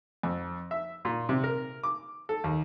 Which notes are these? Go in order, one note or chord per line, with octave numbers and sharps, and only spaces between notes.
F2
E5
A#2
C3
A#4
D6
A4
D#2